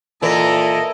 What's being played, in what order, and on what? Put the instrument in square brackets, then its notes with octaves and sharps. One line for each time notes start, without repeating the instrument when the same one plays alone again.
[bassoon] A#2 [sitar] E3 [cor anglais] A4 [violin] A#4 D#5